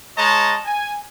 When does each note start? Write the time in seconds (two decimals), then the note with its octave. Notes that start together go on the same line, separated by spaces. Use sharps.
0.17 G#3 C#5 D#5 A5 A#5
0.65 G#5